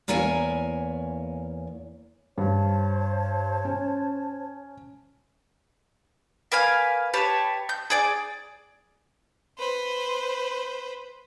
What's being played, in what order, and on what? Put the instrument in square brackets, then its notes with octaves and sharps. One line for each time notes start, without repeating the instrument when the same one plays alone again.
[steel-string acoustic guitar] E2 A#3 E4 C#5 G#5
[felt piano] G2 [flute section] C5 C#5 A5
[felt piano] C#4
[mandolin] A#3 B4 F5 G#5
G4 B4 C#5 A5
G6
G#4 D5 D6
[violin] B4 C5